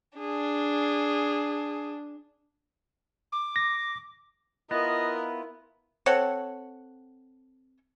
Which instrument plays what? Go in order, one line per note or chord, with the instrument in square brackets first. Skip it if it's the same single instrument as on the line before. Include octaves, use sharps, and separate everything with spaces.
[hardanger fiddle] D4 [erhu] G#4
[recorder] D6
[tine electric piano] A#6
[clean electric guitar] B3 [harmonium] E4 F4 [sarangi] A#4 [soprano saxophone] D#5
[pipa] C4 A4 C#5 F#5